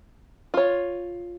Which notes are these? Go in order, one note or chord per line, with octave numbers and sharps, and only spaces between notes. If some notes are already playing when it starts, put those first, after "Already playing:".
F4 C#5